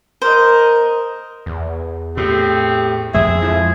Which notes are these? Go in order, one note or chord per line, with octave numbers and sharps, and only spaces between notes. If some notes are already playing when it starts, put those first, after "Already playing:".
A#4 C5 D#5
E2
A2 C4 G4
F2 G#3 G#4 E5
F3 E4